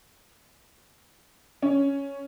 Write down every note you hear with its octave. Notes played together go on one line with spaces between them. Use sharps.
C#4